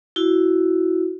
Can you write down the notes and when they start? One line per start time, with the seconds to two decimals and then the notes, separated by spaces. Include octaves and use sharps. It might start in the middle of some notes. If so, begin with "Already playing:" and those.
0.16 E4 F#4